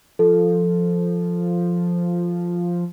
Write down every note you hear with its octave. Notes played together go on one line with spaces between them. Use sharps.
F3 A4